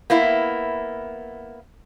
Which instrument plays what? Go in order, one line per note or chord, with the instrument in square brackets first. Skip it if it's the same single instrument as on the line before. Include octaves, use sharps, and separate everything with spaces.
[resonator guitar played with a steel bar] A#3 B3 E4